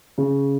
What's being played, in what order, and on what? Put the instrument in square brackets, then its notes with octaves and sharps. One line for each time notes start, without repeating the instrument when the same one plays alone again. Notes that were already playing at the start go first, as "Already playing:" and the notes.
[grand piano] C#3